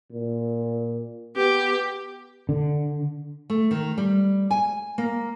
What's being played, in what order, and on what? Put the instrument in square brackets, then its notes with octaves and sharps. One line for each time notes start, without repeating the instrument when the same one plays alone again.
[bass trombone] A#2
[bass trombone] B3 [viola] G4
[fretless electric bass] D3
[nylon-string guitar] A3
D#3
G3
G#5
A#3